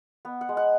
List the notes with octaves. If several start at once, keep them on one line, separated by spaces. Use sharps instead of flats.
B3
F#5
G#3
F#5